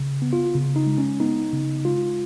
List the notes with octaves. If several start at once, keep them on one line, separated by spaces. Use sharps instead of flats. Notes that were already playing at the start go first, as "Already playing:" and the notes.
Already playing: C#3
B3
F4
C#3
D#4
G#3
C#4
B3 D#4
C#3
G#3 F4